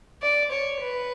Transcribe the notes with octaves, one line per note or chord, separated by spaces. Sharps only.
D5
C#5
B4